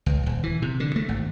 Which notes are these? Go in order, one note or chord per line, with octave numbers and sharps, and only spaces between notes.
C#2
D#1
E3
C3
D3
A3
G#1